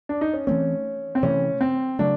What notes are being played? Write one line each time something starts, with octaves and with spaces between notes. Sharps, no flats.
D4
D#4
C#4
E3 A3 C4 C#4
C4
C3 E3 A3 C#4
C4
C#3 F#3 A3 D4